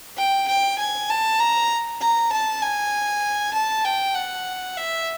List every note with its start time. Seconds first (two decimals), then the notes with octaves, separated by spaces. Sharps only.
0.17 G5
0.48 G5
0.78 G#5
1.10 A5
1.40 A#5
2.01 A#5
2.32 A5
2.62 G#5
3.54 A5
3.85 G5
4.15 F#5
4.77 E5